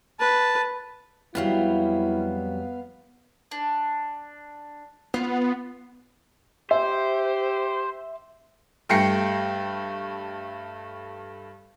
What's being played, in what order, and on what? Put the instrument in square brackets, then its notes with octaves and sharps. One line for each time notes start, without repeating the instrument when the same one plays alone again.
[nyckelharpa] B4 [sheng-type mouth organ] A5
[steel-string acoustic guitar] F2 F#3 G3 [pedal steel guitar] B3 F5 [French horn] E4
[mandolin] D4
[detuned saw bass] B3 [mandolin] F4
[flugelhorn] G4 [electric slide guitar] C5 [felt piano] E5
[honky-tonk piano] G2 A3 G5 A#6 C7 C#7